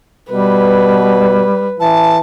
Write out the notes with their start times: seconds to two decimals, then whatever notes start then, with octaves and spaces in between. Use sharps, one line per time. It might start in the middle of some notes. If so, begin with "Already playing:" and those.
0.31 B2 G3 B4
1.80 E3 A5